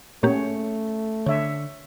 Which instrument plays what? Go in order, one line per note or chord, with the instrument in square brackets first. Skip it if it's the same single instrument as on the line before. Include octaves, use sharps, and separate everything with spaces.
[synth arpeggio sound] A#2 A#3 G4 [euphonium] A3 [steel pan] C#4 C#5
[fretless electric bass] D3 [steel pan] C#5 E5